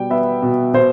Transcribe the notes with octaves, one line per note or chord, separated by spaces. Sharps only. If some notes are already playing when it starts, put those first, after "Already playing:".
Already playing: B2 G3 G5
B3 E5
B2
B2 C5